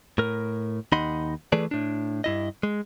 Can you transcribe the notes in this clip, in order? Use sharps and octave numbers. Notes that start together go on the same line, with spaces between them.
A2 A#4
D#2 D#4 D#5 F#5 B5 C6
E3 A3 G#4 A4 B4 D5
A2 D4
G2 E4 D#5
G#3